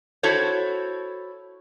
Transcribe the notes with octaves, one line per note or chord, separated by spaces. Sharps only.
E4 F#4 A4 C5 C#5